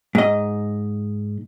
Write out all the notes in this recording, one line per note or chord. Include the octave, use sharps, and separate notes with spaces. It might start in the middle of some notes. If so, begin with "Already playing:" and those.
G#2 D#5